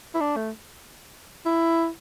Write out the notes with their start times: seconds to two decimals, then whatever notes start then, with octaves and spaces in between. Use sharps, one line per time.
0.15 E4
0.20 D4
0.36 A3
1.45 E4